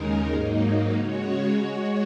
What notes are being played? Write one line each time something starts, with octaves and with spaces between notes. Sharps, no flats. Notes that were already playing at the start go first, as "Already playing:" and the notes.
Already playing: D#2 C#3 G#3 D#4 A#4
G#2 F#3 A#3 D#4
C#3 G#3 F#4 C#5
G#3 F#4 C#5